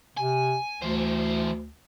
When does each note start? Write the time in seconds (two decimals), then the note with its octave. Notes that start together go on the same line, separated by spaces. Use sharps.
0.17 C3 G#5
0.82 D2 E3 C5